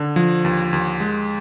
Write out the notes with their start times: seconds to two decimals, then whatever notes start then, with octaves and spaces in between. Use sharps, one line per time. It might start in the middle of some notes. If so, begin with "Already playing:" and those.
Already playing: D3
0.16 F3
0.45 D#2
0.73 D#2
1.00 G#3